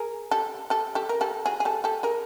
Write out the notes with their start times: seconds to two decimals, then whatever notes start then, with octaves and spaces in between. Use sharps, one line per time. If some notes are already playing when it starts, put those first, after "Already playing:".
Already playing: G#4 A#4
0.31 G4 A4
0.70 G4 A4
0.95 G4 A4
1.09 A#4
1.21 G4 A4
1.46 F#4 G#4
1.60 G#4
1.65 G4 A4
1.84 G4 A4
2.03 G#4 A#4